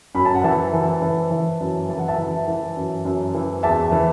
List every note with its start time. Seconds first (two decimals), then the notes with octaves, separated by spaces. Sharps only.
0.15 F#2 B5
0.25 A5
0.35 F#5
0.43 E3 E5 A5
0.73 E3
1.02 E3
1.31 E3
1.60 F#2
1.89 E3 A5
1.99 F#5
2.08 E5 A5
2.18 E3
2.47 E3
2.77 F#2
3.05 F#2
3.34 E3
3.63 E2 E5 A5
3.92 E3